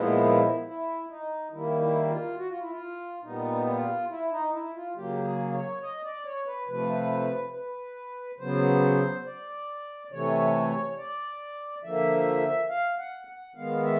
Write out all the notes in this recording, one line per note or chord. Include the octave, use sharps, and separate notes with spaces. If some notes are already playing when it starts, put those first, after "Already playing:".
Already playing: A#2 F3 G#3 B3 E4
E4
D#4
D#3 G3 A#3 E4
E4
F4
F#4
F4
E4
F4
A#2 G3 B3 D#4
F4
E4
D#4
E4
F4
C#3 F#3 A#3 G4
G#4
C#5
D#5
D5
C#5
B4
C3 F3 A3 B4
B4
C#3 F#3 B3 C5
D5
C3 E3 A3 C#5
D5
D3 F3 A#3 E5
F5
F#5
F#5
D#3 G#3 B3 F5
E5